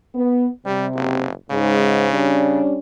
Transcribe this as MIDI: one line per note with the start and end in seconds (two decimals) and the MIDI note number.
0.14 0.46 59
0.65 1.27 48
0.65 0.87 55
0.95 1.32 30
1.50 2.07 44
1.50 2.61 49
2.12 2.77 55
2.12 2.77 61
2.12 2.77 62